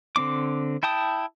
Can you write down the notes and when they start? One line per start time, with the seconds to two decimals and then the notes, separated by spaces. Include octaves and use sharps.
0.16 D3 C4 D4 D6
0.83 E4 G5 A5 D#6